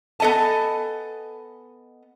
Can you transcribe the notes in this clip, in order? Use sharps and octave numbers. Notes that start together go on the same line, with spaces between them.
B3 A4 D#5 G#5 A5